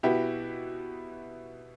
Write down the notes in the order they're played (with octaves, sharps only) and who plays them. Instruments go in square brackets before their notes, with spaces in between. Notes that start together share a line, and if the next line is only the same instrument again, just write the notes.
[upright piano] B2 B3 E4 G4